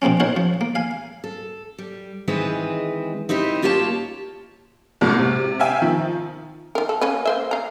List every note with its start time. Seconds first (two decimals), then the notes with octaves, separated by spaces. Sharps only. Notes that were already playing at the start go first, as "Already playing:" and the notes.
0.02 B2 F3 A#3 C4 C#4
0.20 D#4 F#4 A#4 C5 C#5
0.37 F3
0.61 A#3
0.75 F5 G#5
1.24 A4
1.78 G3
2.28 D#3 E3 G#3 C4 G#4 B4
3.29 C4 D#4 E4 G4
3.62 A#3 F4 G4 C#5 F5 A5
5.01 C2 F#2 A2 G#3 A#3
5.19 C3
5.59 E5 F5 G5 G#5 E6
5.82 D#3 F3
6.75 D#3 A#4
6.89 A4
7.01 A#3 C#4 B4
7.25 A#3 C5 E5
7.51 F5 A#5